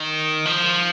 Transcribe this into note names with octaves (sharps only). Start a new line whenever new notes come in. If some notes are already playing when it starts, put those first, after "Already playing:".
Already playing: D#3
F3